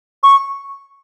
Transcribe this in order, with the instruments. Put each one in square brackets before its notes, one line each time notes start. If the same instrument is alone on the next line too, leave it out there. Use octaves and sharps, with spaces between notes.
[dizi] C#6